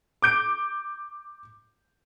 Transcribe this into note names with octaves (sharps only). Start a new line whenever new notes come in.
D6 G6 D7